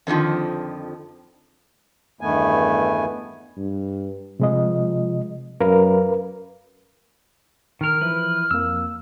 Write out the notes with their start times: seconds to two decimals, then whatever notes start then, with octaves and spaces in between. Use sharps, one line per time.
0.07 F2 D3 D#3 F3
2.21 E2 G2 D#3 A3 B3 G#5
3.57 G2
4.40 C3 F3 G#3 D#5
5.61 F#2 A#4 B4 F5
7.81 D#3 A#4 F6
8.01 E3 F3 E4 B4
8.51 F2 A#3 E6